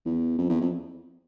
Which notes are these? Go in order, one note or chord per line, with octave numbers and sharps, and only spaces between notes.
E2
F2
E2
F2